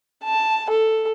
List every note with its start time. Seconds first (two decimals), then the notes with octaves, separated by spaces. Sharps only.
0.24 A5
0.70 A4